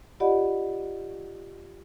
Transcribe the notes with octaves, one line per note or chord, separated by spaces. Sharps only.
F4 G4 D5 D#5 F#5 B5